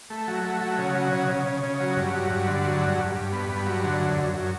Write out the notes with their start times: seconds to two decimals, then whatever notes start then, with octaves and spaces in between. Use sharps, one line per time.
0.10 A3
0.28 F#3
0.44 A3
0.61 F#3
0.78 C#3
0.95 F#3
1.12 C#3
1.29 C#3
1.46 C#3
1.63 C#3
1.80 F#3
1.96 G2
2.13 F#3
2.30 G2
2.47 D3
2.64 F#3
2.81 G2
2.98 G2
3.15 G2
3.32 B3
3.49 G2
3.66 F#3
3.83 D3
4.00 F#2
4.17 F#2
4.34 F#2